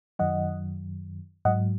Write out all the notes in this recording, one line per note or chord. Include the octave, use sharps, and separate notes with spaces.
F#2 D#3 F#3 D#5 F#5
G#2 F#3 D#5 F#5